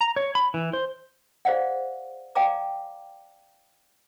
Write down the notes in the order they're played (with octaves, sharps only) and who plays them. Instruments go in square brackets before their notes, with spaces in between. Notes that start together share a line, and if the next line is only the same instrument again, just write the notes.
[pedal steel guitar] A#5
C#5
B5
E3
C5
[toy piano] G#4 C5 D5 F5 F#5
D5 F5 G5 G#5 A#5 D6